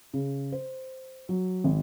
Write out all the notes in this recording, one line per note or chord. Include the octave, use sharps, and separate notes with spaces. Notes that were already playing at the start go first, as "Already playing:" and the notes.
C#3
C5
F#3
G#1